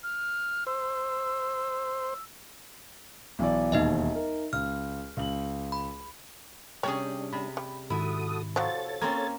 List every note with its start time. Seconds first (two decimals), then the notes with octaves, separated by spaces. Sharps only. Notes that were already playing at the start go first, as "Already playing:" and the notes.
0.03 F6
0.67 C5 E6
3.39 B1 E3 D5
3.72 E1 D#2 D#4 D#5 E5
4.15 A#4
4.53 C#2 F6
5.17 C#2 F#7
5.72 B5
6.83 C3 G3 C#4 D4 G#4 C#5 G5
7.33 C3 B5
7.57 G3
7.90 G#2 D#3 E4 F#4 A4 D#6
8.56 F3 F#3 A4 C#5 A6
9.01 A#3 C4 C#4 G#6